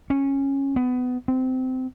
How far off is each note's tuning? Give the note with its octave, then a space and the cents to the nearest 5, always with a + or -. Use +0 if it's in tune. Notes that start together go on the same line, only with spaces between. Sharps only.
C#4 -10
B3 +20
C4 -20